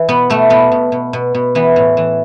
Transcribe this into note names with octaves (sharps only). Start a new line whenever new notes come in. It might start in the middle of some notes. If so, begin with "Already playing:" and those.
Already playing: E3
B2 B3
B2 A3
B2 B3
B2
B2
B2
B2
E3 B3
A2
E3